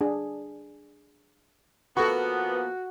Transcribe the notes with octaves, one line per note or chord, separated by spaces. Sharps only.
D4 G#4
F3 A#3 B3 F#4 A4 B5